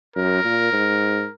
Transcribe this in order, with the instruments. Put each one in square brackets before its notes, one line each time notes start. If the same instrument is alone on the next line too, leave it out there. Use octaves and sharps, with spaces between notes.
[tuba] F#2 [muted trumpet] A#4
[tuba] A#2
G#2